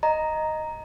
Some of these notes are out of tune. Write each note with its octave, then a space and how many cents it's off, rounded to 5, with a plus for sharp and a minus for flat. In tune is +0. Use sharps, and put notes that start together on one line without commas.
D#5 +0 A#5 +0